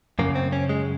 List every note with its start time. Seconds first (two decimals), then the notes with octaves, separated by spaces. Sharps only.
0.19 F#2 C#3 A#3
0.35 C4
0.52 C#4
0.69 G#3